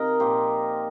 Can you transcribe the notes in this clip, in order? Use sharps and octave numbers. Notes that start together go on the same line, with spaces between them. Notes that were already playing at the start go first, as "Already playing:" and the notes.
Already playing: C3 D#4 A#4 D#5 F5 G5 A#5
A#2 F3 A#3 G4 C5